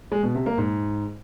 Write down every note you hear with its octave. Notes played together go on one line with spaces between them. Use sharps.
G#3
B2
C3
A#3
G#2